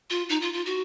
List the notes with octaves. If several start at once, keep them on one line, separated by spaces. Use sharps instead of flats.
F4
D#4
F4
F4
F#4